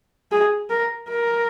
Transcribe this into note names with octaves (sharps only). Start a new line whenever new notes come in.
G#4
A#4
A#4